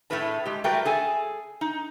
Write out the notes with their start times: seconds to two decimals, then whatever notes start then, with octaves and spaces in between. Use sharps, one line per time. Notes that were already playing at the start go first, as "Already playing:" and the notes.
0.10 A2 A3 D#4 G#4 B4 A5
0.46 G#3 G4
0.64 G3 A3 F#4 A#4 B4 G5
0.85 G#4 A4 G#5
1.61 D#4